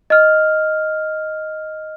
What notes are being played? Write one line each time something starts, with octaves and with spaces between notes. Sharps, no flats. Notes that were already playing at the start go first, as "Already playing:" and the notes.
D#5 F6